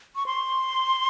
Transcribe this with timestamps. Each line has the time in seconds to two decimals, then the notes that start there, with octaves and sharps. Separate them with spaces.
0.16 C#6
0.26 C6